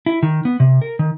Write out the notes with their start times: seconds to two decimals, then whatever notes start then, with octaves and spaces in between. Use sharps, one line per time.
0.06 E4
0.23 D#3
0.45 B3
0.60 C3
0.82 A#4
0.99 D#3